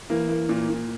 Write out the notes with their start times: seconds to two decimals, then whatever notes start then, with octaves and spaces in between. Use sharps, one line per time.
0.10 E3 A#3
0.29 A#3
0.49 A#2
0.70 A#2